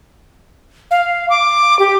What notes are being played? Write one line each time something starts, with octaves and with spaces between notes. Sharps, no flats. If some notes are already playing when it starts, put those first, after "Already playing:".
F5
D6
G4